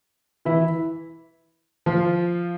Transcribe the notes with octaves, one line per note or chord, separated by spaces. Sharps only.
E3 E4
F3 F4